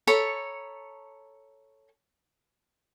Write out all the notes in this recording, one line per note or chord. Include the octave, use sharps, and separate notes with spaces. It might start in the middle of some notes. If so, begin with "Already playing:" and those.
A4 C#5 A#5 B5